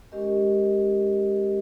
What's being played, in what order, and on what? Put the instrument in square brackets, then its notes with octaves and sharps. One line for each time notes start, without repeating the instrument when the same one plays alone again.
[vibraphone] G#3 C#4 G4 A#4 D#5